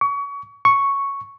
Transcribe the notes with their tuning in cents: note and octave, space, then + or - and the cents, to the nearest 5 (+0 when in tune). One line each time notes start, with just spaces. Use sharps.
C#6 +30
C#6 +0